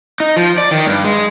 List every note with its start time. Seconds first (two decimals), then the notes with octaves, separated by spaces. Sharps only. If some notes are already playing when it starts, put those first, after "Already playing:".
0.20 D#4
0.36 F3
0.58 D5
0.71 D#3
0.86 G2
1.04 G#3